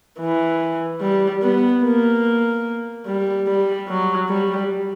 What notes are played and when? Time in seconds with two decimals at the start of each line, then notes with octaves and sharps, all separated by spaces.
0.20 E3
1.01 G3
1.43 B3
1.83 A#3
3.07 G3
3.47 G3
3.88 F#3
4.29 G3